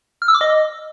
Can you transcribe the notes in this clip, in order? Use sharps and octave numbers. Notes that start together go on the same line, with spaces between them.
F6
E6
D6
D#5